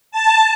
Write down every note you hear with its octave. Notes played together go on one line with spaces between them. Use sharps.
A5